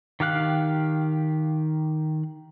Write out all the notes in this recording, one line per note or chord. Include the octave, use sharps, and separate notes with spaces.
D#3 G4 F5 F#6